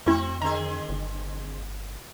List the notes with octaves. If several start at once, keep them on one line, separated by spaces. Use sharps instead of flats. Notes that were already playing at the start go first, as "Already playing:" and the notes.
F2 A3 C4 E4 F#4
D3 C4 G#4 A#5
G1